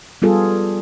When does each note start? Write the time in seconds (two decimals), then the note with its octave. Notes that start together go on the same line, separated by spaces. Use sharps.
0.22 G3 B3 F4 G#4 A4